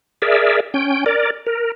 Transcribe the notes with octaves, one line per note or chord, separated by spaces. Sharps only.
G#4 A#4 D5 E5
C#4 G5
A#4 D5
A#4